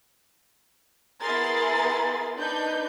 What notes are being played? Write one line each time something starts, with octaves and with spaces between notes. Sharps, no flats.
B3 E4 G#4 A#4 C6 A6
D4 D#4 B4 G6